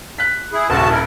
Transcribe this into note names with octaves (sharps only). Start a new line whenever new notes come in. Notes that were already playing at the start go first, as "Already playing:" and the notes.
F#6 B6
E4 G#4
D#1 A1 C#3 F#4 A5
E4 A#4